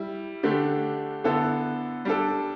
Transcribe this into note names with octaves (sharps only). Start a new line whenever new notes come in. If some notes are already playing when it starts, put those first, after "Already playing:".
Already playing: G3 E4
D3 A3 D4 G4
D3 B3 E4 A4
G3 D4 A4